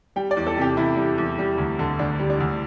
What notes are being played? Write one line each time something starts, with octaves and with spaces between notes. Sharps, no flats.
G3 G5
D5
E2
A4
C3 G4
E2 E4
G3
E2
G3
D2
D3
D2 D4
G3
D4
D2